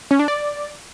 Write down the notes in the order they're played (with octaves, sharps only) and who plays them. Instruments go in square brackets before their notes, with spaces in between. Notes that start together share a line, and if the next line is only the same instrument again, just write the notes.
[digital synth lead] C#4
D4
D5